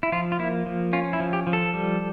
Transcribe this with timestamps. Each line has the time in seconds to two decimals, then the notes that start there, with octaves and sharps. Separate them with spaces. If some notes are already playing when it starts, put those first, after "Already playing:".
0.03 E4
0.12 F3 F4
0.32 F4
0.39 A#3 E4
0.66 F3
0.93 C#4 F4
1.13 E4
1.20 F3
1.33 G4
1.47 F3
1.53 A4
1.74 G3